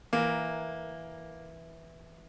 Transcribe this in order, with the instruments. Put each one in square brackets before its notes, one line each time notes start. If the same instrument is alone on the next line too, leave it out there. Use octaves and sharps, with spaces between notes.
[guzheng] E3 A#4 [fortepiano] A#3